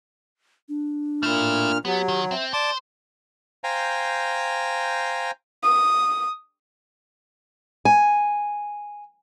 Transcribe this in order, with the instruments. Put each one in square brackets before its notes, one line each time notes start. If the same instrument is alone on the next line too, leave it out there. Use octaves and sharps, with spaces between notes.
[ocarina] D4
[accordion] A#2 F6 [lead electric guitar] A3 E4
[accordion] F#3 [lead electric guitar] B3 [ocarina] G4
[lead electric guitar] D#3
[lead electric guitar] C4 [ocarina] E5
[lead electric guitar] C5 [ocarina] D5 [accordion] A5 D6
[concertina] C5 F5 G5 G#5 A#5
[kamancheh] D#6
[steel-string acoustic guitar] G#5